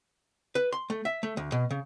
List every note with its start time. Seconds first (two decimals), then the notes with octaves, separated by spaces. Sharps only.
0.55 B4
0.73 C6
0.90 A3
1.05 E5
1.23 A3
1.37 D2
1.52 B2
1.71 C#3